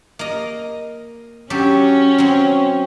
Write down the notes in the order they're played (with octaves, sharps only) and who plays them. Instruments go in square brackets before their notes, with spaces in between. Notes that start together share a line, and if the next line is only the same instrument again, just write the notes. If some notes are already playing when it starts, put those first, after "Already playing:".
[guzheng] A#3 D#5
[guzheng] F#3 G4 A4 [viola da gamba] C#4
[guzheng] F#3 C4